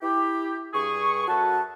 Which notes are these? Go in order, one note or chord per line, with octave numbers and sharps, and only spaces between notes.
E4 G4
G2 G#4 C#6
F#2 F#4 A4 B4 A5